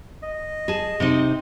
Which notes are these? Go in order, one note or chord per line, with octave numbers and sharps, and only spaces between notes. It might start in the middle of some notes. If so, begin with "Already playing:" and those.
D#5
G#4 A5
C3 C4 D#4